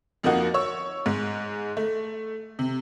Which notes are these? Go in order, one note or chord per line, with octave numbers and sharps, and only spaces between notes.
F2 F3 A#3 D#4 F#4
C#5 C#6 E6
G#2 G#3
A3
C3